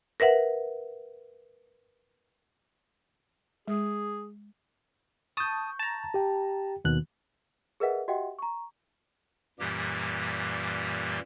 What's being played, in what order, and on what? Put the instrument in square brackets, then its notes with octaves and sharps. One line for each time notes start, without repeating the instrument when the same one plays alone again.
[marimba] A#4 B4 E5 F#5
[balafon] G#3 [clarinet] G#4
[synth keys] A5 D#6 [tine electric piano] C#6 G6
[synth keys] A5 A#5
[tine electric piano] G4 G5
[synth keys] D#2 B2 F#6 [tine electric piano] D#3
[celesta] G#4 A#4 B4 D#5 E5 F#5
F#4 G4 D#5 E5 F#5 G5
A#5 C#6
[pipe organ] F#2 A#2 E3 G3 A#3 G4